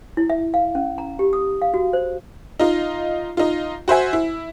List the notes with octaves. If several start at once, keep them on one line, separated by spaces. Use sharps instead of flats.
E4
E5
F5
C#4
A#5
G4
D#6
F5
F#4
C5
D#4 F4
D#4 F4
F#4 C5 E5 G#5
E4